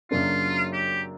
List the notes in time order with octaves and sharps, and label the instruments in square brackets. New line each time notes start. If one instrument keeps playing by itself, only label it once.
[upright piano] F#2 C#3 F#3 A#3 D4 [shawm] F4
[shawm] G4